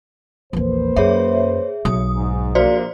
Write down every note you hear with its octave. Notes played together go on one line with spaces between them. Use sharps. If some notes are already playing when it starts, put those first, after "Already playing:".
A#1 E2 A#3 B4 C5
F#2 G#4 C#5 E5
B1 D#6
G#2
A#1 A#3 F#4 C5 D5